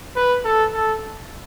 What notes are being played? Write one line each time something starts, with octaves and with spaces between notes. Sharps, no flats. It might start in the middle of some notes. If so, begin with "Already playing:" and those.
B4
A4
A4